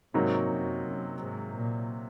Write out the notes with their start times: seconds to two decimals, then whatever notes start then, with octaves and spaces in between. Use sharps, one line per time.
0.14 G#2 C3 F#3 A#3 D#4 F#4
0.51 F#2
0.86 F#2
1.21 G#2
1.57 A#2